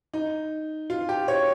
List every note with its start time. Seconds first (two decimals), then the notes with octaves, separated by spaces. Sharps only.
0.14 D#4
0.90 F4
1.09 G4
1.28 C#5